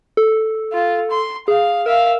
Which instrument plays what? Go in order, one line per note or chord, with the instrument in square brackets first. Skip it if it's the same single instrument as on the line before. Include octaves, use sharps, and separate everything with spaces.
[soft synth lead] A4
[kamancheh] F4
C6
[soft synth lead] G#4 [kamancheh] F5
[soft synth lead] A#4 [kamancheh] E5 F5